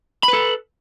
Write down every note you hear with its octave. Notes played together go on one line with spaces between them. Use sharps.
A4 B4 B5